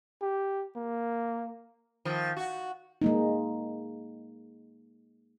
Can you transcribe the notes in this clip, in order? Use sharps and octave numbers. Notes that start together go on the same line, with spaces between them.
G4
A#3
D#3 F3
F#4
G#3 A#3 D#4